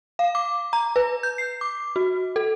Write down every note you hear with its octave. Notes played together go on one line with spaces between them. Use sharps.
F5
D6
A#5
B4
G6
C7
D6
F#4
A4